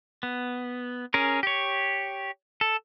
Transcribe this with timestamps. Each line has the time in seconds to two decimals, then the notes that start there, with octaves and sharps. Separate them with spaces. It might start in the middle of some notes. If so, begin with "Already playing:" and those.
0.23 B3
1.14 C#4 G#4 A#4
1.43 G4 C#5
2.61 A4